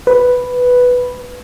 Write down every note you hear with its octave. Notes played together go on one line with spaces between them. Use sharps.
B4